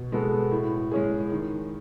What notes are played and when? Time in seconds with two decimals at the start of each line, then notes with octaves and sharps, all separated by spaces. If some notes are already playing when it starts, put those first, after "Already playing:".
Already playing: B2
0.12 G#3 B3 F#4 A4
0.51 A2
0.92 G#3 C#4 G#4
1.32 D#3